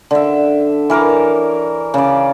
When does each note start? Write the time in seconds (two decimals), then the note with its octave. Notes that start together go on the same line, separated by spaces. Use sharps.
0.11 D3 E5
0.90 E3 A#4 C#5 D6
1.94 C#3 D5